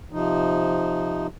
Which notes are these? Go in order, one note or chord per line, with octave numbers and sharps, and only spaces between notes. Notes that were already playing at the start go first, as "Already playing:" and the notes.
C3 F3 D#4